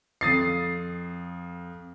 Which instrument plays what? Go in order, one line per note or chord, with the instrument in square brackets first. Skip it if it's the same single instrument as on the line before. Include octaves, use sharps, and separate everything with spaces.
[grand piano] F2 D#6 A6 C7